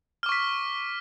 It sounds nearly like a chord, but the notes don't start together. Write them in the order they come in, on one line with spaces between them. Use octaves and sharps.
F6 D6 C#6 B6